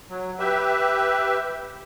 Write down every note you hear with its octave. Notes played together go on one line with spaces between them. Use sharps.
F#3
G4 B4 E5